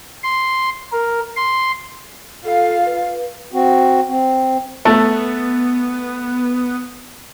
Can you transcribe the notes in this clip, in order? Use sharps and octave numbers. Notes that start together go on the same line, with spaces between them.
C6
A#4
C6
F4 A4 F5
B4
C4 F#4
C4
A3 B3